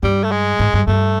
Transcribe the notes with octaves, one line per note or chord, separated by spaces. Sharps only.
G2 G3
A3
G#3
G#2
G2
G2 A3